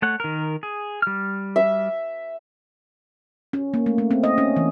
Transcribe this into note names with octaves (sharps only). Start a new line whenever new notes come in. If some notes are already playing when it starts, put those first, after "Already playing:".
A3 C#5 F#5
D#3 A#4
G#4
G3 F6
E5
C#4
A#3
A3
A3
C4
D#5
C#4
E3